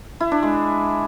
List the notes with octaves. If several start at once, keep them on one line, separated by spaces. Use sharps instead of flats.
E4
D4
G#3